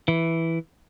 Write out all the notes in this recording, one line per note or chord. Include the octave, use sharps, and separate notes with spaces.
E3